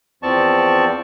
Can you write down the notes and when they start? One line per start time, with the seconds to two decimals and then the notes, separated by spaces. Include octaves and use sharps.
0.23 E2 F3 C4 D5 A5 C#6